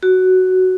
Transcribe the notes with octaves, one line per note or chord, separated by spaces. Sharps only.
F#4